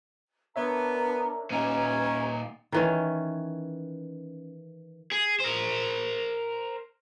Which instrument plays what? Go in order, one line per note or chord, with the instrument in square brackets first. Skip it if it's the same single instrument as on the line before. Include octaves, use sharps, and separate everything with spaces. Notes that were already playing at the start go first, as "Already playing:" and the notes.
[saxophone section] B3 [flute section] D4 A#4 A#5 [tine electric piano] C#5 E5
[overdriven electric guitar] A#2 D#4 [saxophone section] C#4 [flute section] G4 B4 A#5
[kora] D#3 E3 C#4
[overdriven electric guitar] G#4
A#4 C5